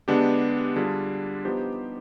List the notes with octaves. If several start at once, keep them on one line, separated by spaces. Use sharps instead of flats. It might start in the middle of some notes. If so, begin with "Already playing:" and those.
D3 G#3 B3 D4 G4
D3 G3 D4 F4 G#4
F3 B3 D#4 G4 C5